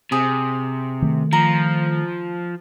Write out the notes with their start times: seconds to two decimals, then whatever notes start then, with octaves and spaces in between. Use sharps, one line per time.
0.12 C3 G#4
1.02 D#3 A3
1.33 F3 A#5